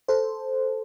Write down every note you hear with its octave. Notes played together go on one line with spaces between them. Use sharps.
A4 C5